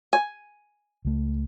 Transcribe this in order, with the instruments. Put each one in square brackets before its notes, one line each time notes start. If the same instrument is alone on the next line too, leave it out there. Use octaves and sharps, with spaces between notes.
[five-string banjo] G#5
[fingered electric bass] C#2 A3